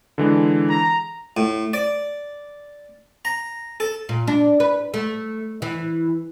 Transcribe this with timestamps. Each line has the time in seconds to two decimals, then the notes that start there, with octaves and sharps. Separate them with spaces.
0.18 D3 E3 G#3
0.70 A#5
1.37 A2
1.73 D5
3.25 A#5
3.80 A4
4.09 A#2
4.27 D4
4.60 B4
4.94 A3
5.62 E3